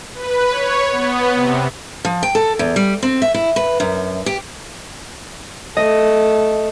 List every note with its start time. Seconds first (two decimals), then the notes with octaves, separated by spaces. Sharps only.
0.14 B4
0.50 C#5
0.91 B3
1.35 C3
2.05 F3
2.23 G5
2.35 A4
2.59 E2
2.76 G3
3.03 C4
3.22 E5
3.34 E4
3.56 B4
3.80 F#2
4.26 G4
5.77 A3 D#5